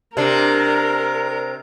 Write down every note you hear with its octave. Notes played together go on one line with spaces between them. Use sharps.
C3 D4 A#4